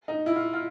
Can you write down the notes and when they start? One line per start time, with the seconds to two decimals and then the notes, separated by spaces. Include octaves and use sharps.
0.08 D#4
0.26 E4
0.36 F4
0.53 F4